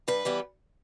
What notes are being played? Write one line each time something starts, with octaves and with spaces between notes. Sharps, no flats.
G2 B4
E3 G3 B3